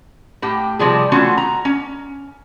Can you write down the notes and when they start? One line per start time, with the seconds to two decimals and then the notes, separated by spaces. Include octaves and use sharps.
0.42 A2 G4 G5
0.79 C3 F3 G3 G#4
1.12 E3 A3 C4 C#4 F4 F#4
1.37 A#5
1.65 C#4